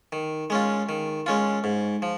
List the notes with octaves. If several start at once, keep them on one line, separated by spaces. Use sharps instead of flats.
D#3
G#3 C#4 F4
D#3
G#3 C#4 F4
G#2
F3